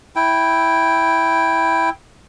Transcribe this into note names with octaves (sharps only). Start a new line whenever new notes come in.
E4 G5